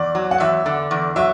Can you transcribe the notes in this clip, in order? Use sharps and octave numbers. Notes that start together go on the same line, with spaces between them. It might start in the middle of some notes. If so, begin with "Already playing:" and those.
Already playing: E2 D5
F#3
F#5
E2 E5
D3
E2
F#3 E5